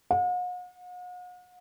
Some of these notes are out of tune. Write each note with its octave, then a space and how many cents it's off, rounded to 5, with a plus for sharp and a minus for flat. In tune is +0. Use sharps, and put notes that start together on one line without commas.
F#5 -45